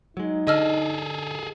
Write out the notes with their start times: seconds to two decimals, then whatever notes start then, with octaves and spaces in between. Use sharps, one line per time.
0.17 F#3 G#3 D#4
0.47 D3 G#4 A4 D#5 E6 F6